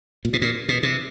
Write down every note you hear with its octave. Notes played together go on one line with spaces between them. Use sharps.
A#2
B2
A#2
B2
C3